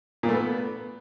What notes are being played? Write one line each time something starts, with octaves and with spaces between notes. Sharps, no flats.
A#2
A3
B3